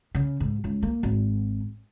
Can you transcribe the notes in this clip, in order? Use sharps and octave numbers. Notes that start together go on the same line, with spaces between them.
C#3
G#2
C#2
A#3
G#1